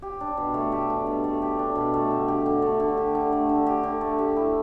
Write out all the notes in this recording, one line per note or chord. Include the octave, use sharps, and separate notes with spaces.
G4
D4
B2
A3
G4
D4
B2
A3
G4
D4
B2
A3
D3
G4
D3
A3
D3
G4
D3
A3
D3
G4
D3
A3
G4
E4